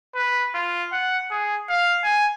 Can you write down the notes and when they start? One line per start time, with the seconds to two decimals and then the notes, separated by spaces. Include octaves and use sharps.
0.15 B4
0.54 F4
0.92 F#5
1.31 G#4
1.69 F5
2.04 G#5